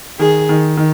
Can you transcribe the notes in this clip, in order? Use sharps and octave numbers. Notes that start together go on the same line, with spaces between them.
D#3 G#4
D#3
D#3